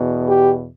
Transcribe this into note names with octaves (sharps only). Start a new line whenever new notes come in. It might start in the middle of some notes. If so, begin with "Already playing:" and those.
Already playing: E2 B2
G4